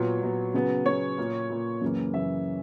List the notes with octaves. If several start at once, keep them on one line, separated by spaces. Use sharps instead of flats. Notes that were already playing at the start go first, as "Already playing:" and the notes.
Already playing: A#2 F#3 B3 C#5
A#2 F#3 B3
C#3 F#3 B3
C#3 F#3 B3 C#5
A#2 A#3
A#2 A#3
F#2 C#3 E3 A#3
F#2 C#3 E3 A#3 E5